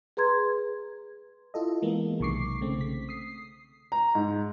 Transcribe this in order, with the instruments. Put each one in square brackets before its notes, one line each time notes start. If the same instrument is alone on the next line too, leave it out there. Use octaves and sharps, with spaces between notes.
[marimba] G#4 B4 A#5 C6 G#6
[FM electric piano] E4 F4 A4 D#5
E3 G#3 A#3 B3
B1 C3 D#3 C#6 D6 C7
C#3 A3 C4
B6
D#6 C7
[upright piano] A#5
G#2